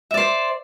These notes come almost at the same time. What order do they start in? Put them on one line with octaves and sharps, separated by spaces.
E5 D5 C5